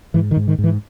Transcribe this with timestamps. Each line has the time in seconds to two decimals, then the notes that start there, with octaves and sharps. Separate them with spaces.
0.14 G#2 E3
0.31 D#3
0.37 G#2
0.48 D#3
0.59 G#2
0.64 E3